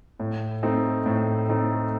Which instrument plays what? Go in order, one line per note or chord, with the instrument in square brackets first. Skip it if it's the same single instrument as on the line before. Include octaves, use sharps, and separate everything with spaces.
[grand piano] A2
A3 C4 D#4
A2
A3 C4 D#4